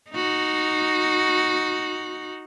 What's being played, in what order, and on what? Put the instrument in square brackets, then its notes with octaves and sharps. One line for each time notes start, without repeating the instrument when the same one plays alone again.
[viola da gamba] D#4 F#4